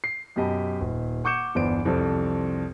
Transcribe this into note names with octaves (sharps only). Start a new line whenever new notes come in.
C7
F#2 B2 G4 D#5 A5 B5
D#1
F#5 C#6 D6 G6 C#7 E7
G1 E2 D4 C5 D7
C2 F2 A4 C5